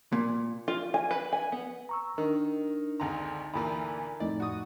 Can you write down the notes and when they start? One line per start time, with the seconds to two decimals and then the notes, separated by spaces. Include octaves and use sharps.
0.12 A#2
0.68 F4
0.94 G#5
1.11 B4
1.33 G#5
1.52 B3
1.89 A#5 C#6 E6
2.18 D#3 D4 D#4 A#4
3.00 G#1 D2 F#5 A#5 C6
3.54 D2 A#2 E3 A#4 A#5 B5
4.20 F2 A2 D#4 D5
4.40 F#4 D#6